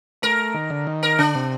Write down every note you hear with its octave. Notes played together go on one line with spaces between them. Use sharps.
A3 A#4
D#3
D3
D#3
A#4
D3 D4
C3